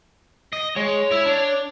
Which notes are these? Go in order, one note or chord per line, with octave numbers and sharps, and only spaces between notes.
D#5
G#3 C#5
E4 E5
D4